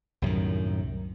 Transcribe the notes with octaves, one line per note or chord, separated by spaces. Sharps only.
C2 F#2 A2 D#3